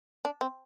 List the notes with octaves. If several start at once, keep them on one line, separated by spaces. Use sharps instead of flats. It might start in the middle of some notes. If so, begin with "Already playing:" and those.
D4
C4